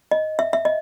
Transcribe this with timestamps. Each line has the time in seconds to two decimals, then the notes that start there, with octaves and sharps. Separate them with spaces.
0.11 D#5
0.39 E5
0.53 E5
0.65 D#5